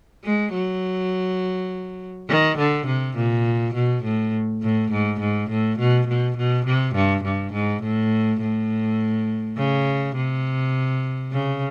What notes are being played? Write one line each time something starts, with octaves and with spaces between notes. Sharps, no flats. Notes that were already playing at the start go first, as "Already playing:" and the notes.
G#3
F#3
D#3
D3
C3
A#2
B2
A2
A2
G#2
G#2
A2
B2
B2
B2
C3
G2
G2
G#2
A2
A2
C#3
C3
C#3